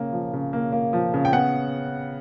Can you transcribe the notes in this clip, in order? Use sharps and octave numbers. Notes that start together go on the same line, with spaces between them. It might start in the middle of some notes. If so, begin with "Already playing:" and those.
Already playing: C#3 A#3
F3
C#3
A#3
A#3
F3
C#3
G5
B3 F#5